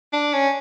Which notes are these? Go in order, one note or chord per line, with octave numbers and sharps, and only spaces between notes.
D4
C#4